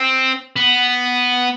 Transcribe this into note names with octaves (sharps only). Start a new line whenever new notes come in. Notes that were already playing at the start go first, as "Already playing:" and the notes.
Already playing: C4
B3